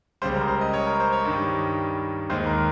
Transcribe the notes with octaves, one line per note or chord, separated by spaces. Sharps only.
C#2 C#3 G3 C5
A#4
C5
D#5
C#5
A#4
C5
C#5
G2 D#3 G3
D#2 D#3 G#3 C5
A#4